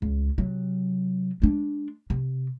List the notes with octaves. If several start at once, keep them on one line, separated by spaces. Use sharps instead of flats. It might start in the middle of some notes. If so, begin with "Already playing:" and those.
C#2
C3 F#3
G#3 D4
C3